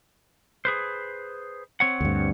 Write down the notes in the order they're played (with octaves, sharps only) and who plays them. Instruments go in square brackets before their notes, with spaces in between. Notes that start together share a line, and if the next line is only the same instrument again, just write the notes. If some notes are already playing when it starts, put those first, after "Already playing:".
[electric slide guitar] G#4 B4 C5
C4 C#5 F#5
[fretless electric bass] D2 G2